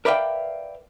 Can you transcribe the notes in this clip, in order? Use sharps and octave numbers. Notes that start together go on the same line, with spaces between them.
A#4 B4 D5 E5 F5 G5